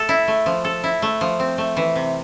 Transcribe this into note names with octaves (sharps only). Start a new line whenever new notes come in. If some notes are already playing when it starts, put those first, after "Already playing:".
Already playing: A3 A4
E4
A3
F3
A4
E4
A3
F3
C4
A3
E3
C3